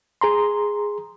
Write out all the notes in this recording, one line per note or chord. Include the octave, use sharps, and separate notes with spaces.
G#4 A#5 C6